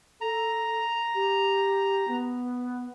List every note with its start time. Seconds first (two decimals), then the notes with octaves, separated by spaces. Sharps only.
0.21 A4 A#5
1.15 G4
2.08 B3